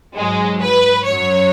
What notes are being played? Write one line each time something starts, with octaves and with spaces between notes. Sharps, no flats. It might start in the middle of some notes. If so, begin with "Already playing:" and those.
G#2 F#3 G#3
B4
F#2 F#3 C#5